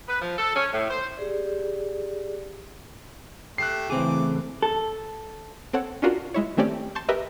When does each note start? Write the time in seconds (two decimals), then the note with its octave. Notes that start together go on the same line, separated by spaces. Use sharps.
0.08 B4
0.21 F3
0.38 A4
0.55 C#4
0.72 A2
0.90 C5
1.17 G4 G#4 D5
3.58 A3 G4 F#6 C7
3.90 C#3 E3 A3 C4 G#4 D6
4.63 A4
5.73 C4 A4 C#5 F#5
6.02 C#4 D4 F4 F#4 A#4
6.34 G#3 E4 C#5
6.57 D#3 A3 C4 C#4 G4 D5
6.95 A5 C6 C#6 G6
7.09 G4 A#4 B4 D#5 E5